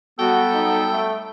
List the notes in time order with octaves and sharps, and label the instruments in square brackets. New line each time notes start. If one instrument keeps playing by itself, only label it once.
[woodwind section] F#3 G3 B3 [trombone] F#4 [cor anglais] A4 [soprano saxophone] G5
[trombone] D#4
A3